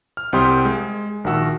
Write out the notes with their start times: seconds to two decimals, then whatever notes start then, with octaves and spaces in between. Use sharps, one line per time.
0.17 F6
0.33 C2 C4 G4 C6 D#6
0.65 G#3
1.24 A#1 D#3 F#4 E6